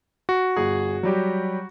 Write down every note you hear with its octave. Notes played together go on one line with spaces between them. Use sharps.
F#4
G1 G#4
F#3 G3 G4